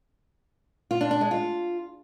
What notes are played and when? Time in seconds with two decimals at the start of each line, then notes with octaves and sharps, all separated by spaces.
0.91 F4
1.01 D4
1.11 D4
1.21 G#3
1.31 F4